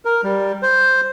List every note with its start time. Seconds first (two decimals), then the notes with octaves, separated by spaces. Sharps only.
0.05 A#4
0.24 G3
0.62 C5